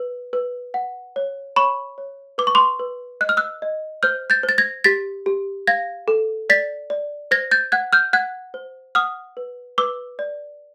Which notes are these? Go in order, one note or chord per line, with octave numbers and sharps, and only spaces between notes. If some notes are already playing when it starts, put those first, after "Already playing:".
Already playing: B4
B4
F#5
C#5
C#5 B5 C#6
C#5
B4 D6
C#6
C6 D6
B4
D#5 F#6
F6
E6 F#6
D#5
C5 F6 G6
G6 A6
C5
A6
G#6 A#6
G4 A6 B6
G4
F5 G#6 A#6
A4
D5 A6 B6
D5
C5 G#6 A#6
G6 A6
F#5 F#6 G#6
F6 G6
F#5 F#6 G#6
C5
F#5 D#6 F6
B4
B4 D6 E6
D5